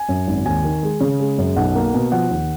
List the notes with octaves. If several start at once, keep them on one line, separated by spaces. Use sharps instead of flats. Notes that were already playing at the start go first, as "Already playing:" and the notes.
Already playing: G#5
F#2
G#1
D#2 G#5
D#3
G#3
C#3
G#3
F#2
B1 F#5
A#3
B2
F3 F#5
D#2